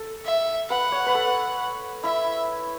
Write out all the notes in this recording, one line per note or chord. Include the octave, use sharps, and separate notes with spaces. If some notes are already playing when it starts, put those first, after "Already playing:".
Already playing: A4
E5
B4 F#5
C#5
B4
A4
E4 E5